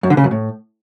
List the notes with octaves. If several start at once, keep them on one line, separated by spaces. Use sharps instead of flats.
F#2
D3
C#3
F#2
A2